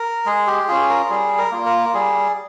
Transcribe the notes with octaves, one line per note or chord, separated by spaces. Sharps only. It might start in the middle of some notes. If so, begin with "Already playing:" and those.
Already playing: A#4
G#3 G#4
G4
C#4 F4 G#4
A#4
G3 G#4
A#4
A#3 F4
A#4
G3 G#4